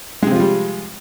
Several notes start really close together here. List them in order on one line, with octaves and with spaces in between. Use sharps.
G#3 C3 F3 F4 G3